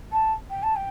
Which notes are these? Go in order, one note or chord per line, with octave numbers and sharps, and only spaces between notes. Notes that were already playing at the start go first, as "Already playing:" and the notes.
A5
G5
A5
G5